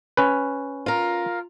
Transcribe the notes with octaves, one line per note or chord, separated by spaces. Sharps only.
C#4 B4
F4 A#4